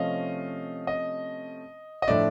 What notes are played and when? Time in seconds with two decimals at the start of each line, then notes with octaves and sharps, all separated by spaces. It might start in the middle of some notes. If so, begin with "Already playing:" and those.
Already playing: C3 F3 A3 C#4 D#5 F5
0.87 D#5
2.02 D#5
2.08 A2 F3 A3 D4 D5 E5